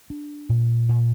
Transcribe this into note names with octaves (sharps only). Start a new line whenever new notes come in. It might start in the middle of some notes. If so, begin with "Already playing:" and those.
D4
A#2
A#2